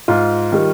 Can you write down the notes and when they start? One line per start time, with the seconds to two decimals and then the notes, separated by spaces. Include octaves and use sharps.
0.08 G#2 F4
0.52 D#3 G3